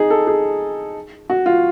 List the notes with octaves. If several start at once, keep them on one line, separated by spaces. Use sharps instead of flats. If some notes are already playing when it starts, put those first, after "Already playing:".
Already playing: D#4 G#4
A4
G#4
F#4
F4